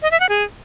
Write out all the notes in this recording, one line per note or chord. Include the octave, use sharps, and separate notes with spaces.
D#5
E5
F#5
G#4